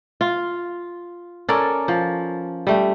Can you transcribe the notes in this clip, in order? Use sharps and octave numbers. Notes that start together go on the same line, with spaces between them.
F4
C#4 A4 A#4 D5
F3
G3 A3